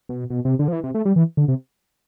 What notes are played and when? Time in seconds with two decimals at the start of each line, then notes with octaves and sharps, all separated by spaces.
0.09 B2
0.30 B2
0.45 C3
0.59 D3
0.68 F3
0.73 E3
0.83 C3
0.94 A3
1.05 G3
1.16 E3
1.37 D3
1.48 C3